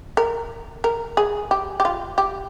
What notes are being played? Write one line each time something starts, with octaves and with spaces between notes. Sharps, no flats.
A#4
A#4
G#4
G4
G4
F4
G4